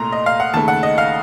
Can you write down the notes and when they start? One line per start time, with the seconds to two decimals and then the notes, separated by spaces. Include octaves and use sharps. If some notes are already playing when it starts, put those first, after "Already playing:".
Already playing: C2 A#2 A3 A#5 C6
0.12 D#5
0.26 F5
0.40 F#5
0.54 D#2 C#3 A3 A5
0.68 F#5
0.83 D#5
0.98 F5